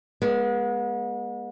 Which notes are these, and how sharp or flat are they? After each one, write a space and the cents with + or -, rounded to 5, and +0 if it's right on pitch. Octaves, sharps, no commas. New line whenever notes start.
G#3 -5 B3 -40